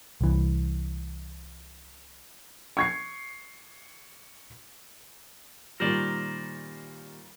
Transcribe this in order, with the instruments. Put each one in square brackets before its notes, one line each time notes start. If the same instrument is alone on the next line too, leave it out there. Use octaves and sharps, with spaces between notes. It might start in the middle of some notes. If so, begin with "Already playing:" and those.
[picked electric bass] C2 E3
[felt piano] C#6 G#6 C7
[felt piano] A#2 D#3 G3 [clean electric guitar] A#4 C5 D5